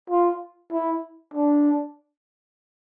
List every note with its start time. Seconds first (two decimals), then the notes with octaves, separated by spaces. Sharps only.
0.10 F4
0.72 E4
1.34 D4